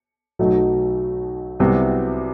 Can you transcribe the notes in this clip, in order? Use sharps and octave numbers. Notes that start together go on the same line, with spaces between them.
B1 B2 F#3 A3 D#4
C2 C3 F#3 B3 F#4